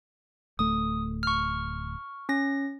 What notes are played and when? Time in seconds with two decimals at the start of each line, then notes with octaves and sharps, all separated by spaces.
0.59 D1 A3 D#6
1.23 C#6 F6
2.29 C#4 A#6